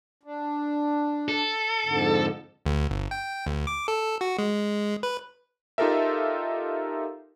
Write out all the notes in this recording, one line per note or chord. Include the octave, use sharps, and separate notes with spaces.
D4
A4
F2 G#2 D3
D2
G1
G5
D2
D6
A4
F#4
G#3
B4
D#4 F4 G4 A4 A#4 E5